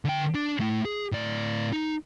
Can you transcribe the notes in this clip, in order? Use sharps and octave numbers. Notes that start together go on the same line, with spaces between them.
D3 G5
D4 D5
A3 E4
G#4
A2 D5
D#4